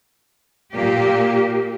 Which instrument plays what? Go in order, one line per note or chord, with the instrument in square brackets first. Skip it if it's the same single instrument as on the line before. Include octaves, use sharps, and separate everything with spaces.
[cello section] A#2 A#3 G4